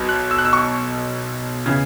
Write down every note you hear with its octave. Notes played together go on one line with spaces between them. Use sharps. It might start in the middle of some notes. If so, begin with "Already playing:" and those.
Already playing: B1 B2 B3
F#6
E6
F#6
E6
C#6
C#3 E3 B3